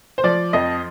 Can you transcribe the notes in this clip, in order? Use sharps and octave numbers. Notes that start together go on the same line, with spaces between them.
C5
F3 D5
F2 D#5